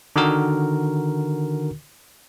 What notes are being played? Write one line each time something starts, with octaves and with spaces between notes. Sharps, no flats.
D3 D#3 F#4 A#4